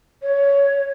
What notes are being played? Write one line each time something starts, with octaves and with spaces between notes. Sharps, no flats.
C#5